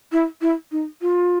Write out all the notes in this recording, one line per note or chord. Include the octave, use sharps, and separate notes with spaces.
E4
E4
D#4
F4